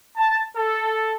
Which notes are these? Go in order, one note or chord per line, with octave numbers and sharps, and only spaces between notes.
A5
A4